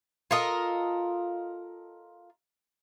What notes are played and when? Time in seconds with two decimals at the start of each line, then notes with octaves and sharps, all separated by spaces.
0.31 F4 A4 A#4 D#5